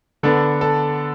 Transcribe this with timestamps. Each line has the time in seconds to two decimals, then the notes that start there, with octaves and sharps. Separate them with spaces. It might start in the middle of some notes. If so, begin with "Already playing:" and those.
0.23 D3 B3 D4 A4
0.61 A4